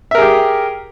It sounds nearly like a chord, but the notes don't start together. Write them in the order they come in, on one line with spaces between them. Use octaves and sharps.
E5 A#4 G#4 G4